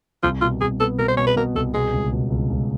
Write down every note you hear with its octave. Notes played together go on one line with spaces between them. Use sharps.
C2 F4
B2 F4
C2 G#4
B3 A4
B2 A#4
C5
B2 C#5
B4
B2 A#4
C2 A4
B2 G#4
C#2
B2
C#2
C#2